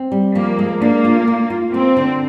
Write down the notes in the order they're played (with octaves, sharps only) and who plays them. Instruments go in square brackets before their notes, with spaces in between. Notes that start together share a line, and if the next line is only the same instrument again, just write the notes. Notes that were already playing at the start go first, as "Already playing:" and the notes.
Already playing: [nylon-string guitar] C4
G3
[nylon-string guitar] F3 [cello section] A#3
[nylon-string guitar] G#3
[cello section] A#3 [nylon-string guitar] D4
[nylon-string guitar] F4
F4
F4
[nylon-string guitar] A#3 [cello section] C4
[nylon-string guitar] D3